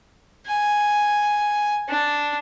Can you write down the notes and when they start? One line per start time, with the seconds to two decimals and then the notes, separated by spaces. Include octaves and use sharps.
0.47 G#5
1.89 D4